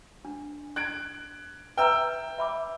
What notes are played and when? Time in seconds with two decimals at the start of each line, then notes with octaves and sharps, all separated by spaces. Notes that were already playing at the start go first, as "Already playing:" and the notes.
0.25 D4
0.76 F#6 G#6 D7
1.77 B4 E5 G5 A#5 E6
2.38 E5 B5 D6